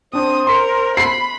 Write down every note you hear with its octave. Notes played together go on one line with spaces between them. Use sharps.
C4 D4 C5 D#6
A#4 C6 B6 C#7
B5 C7